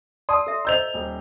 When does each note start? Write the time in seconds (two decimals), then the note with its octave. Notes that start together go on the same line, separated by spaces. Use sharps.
0.29 D5 A5 C6 D#6 E6
0.47 A4 E5
0.65 C5 D#5 A#5 E6 G6 F7
0.94 D#1